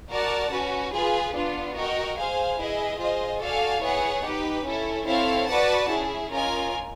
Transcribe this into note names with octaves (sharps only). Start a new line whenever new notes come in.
F#4 A#4 D5 F#5 A5
C#4 F#4 B4
F4 G#4 B4
B3 D4 F4
F#4 A#4 D#5 G5
G#4 C5 F5 G#5
E4 G#4 B4 D#5
F4 G#4 C5 D#5
F#4 A4 D5 F5 G#5
B3 E4 G#4 C#5 F#5
D#4 G4 B4
C#4 E4 A4
C4 E4 A4 C#5 F5
F#4 B4 D5 F#5 A5
C#4 E4 G#4
C#4 F4 A#4 D#5 G#5